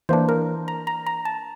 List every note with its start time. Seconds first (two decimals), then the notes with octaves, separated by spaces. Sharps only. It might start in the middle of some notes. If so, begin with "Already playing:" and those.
0.09 E3 A#3 D4 C5
0.29 A#4
0.68 A#5
0.87 A#5
1.06 A#5
1.25 A5